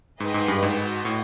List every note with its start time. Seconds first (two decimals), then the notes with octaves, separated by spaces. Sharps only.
0.20 G#2 G#4 B4 D#5 G5
0.34 G#2
0.48 G2
0.63 G#2
0.76 F#4 B4 D#5
1.05 A2